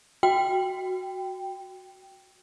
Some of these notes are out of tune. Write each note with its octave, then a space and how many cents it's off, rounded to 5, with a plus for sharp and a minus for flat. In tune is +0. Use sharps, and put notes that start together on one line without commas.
F#4 +0 G5 +0